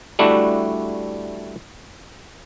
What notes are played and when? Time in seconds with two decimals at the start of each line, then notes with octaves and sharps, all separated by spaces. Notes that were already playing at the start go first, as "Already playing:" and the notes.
0.19 G3 A3 D4 E4 F#4